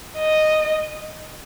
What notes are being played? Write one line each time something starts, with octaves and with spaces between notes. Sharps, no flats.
D#5